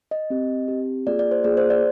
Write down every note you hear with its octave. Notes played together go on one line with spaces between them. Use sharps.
D#5
C4 G4
C4 G4
A#3 F4 G#4 D5
D5
C5
A#3 F4 G#4 D5
C5
D5